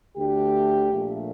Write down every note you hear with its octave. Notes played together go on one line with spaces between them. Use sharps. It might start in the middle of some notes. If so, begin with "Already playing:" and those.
D2 D3 A3 G4
A#1 A#2 A3